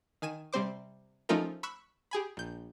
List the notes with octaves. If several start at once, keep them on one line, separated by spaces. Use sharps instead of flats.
D#3 G#5 D#7 E7
C3 G3 C4 C5 D6
F3 A3 C#4 D#4 F4 A#4
B5 C#6 E6 F#6
G4 G#4 G#5 B5
A#1 G6